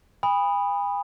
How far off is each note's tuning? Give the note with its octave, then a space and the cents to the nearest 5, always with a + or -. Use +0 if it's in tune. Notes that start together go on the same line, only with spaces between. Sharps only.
G#5 -45 B5 +0 D#6 -5